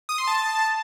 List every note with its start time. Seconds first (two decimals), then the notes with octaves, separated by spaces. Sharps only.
0.09 D#6
0.18 C6
0.27 A5